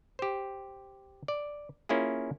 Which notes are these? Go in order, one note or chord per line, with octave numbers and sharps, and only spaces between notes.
G4 C5
D5
A#3 C#4 E4 F4 G#4